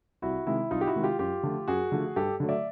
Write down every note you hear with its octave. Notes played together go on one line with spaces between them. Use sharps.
C2 E4 F#4
C3 D#3 G#3 E4
C2 D#4 F4
G4
E4 F#4
C3 D#3 G#3
F4 G4
F#2 F4 G4
D3 F3 A3
F#2 F#4 G#4
D3 F3 A3
G2 G4 A4
D3 F#3 A3
D5 E5